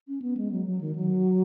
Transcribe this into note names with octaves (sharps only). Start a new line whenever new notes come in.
C#4
B3
G#3
F#3
F#3
D#3
F#3